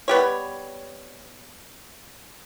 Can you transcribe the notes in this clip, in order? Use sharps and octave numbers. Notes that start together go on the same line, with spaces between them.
G3 B3 G4 C#5